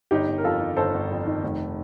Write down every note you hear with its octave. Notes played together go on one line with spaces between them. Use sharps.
G1 D#4 G4
G1
A#4
F2 F4 A4
D#3
G1 A4 C5
G1
F2
D#3
F1